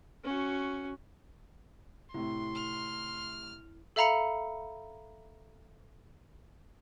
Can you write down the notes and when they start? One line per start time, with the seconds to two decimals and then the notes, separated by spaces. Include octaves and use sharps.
0.24 C#4 F#4
2.14 A2 C3 E4 C6
2.55 F6
3.96 A4 E5 F5 A#5 B5 C#7